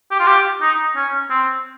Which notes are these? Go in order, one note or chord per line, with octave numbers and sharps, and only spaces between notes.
G4
F4
G4
D#4
C#4
C4